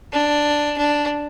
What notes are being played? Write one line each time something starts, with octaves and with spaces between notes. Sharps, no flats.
D4
D4